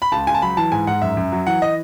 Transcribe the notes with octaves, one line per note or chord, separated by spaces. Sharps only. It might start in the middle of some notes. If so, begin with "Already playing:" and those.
B5
C#2 A5
C#2 G#5
A5
F#3 B5
E3 A5
G#2 G#5
G#2 F#5
F#2 E5
F#2
F#3
E3 F#5
D#5